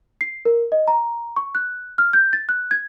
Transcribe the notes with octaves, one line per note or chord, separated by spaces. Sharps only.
C7
A#4
D#5
A#5
C#6
F#6
F6
G6
A6
F#6
G#6